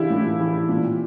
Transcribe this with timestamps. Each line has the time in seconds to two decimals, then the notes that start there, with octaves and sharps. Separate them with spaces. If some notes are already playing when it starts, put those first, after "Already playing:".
Already playing: E3 D4 E4 F4 G4
0.10 A2
0.40 E3
0.69 A#2